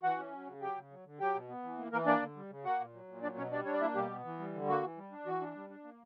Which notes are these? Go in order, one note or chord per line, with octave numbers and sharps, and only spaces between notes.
E3 F#4 F#5
C#4
F#3
C#3
F#3 G4 G5
C#3
F#3
D3
F#3 G4 G5
B2
B3
E3
A#3
E3 A#3 A#4
A#3 D4 D5
D3
G3
C#3
A#3 F#4 F#5
A#2
F#3
A#2
F#3 D4 D5
B2 C#4 C#5
G3 D4 D5
D4 C#5
D5
A#3 E4 E5
B2 G3 G4
B3
E3
G3
D3
A#3 F#4
E3
G3
D4
E3 F#4
D4
G3
D4
A#3